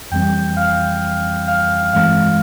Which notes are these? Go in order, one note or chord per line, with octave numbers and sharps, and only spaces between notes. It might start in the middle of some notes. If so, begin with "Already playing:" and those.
F2 E3 G3 C4 G5 G6
F5 F6
F5 F6
G2 E3 G#3 C4 F5 F6